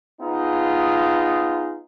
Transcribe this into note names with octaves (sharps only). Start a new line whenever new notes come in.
B3 D#4 F4 G#4